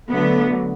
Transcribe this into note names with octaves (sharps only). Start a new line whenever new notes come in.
D3 F#3 A3 B3